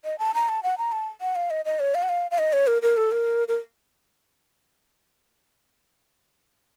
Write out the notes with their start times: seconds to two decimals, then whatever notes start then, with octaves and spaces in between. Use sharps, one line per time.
0.05 D#5
0.19 A5
0.34 A#5
0.49 A5
0.63 F#5
0.78 A#5
0.92 A5
1.21 F#5
1.36 F5
1.50 D#5
1.65 D#5
1.80 C#5
1.95 F5
2.03 F#5
2.09 F5
2.31 F5
2.39 D#5
2.53 C#5
2.67 A#4
2.82 A#4
2.97 A4
3.12 A#4
3.48 A#4